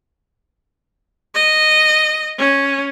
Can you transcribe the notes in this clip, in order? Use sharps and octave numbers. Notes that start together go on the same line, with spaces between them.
D#5
C#4